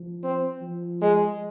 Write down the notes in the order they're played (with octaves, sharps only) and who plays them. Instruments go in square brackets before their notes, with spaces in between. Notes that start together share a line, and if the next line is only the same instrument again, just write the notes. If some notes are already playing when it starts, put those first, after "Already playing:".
Already playing: [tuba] F3
[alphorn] C4
[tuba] F3
[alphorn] G#3